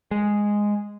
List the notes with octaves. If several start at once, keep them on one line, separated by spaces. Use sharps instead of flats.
G#3